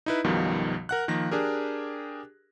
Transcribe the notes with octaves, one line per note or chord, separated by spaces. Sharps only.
D#4 E4 B4
B1 F#2 B2 D#3 F3 G3
A#4 F#5 F#6
D#3 F3 A#3 A#6
D4 G4 G#4 A#4